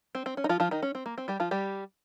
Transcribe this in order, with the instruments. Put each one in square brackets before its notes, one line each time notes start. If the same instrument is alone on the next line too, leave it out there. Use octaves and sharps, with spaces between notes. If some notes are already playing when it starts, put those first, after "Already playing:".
[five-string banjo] C4
C4
C#4
D#4
F3 F4
F3 F4
D#3 D#4
C#4
C4
A#3
C4
G3 G4
F3 F4
G3 G4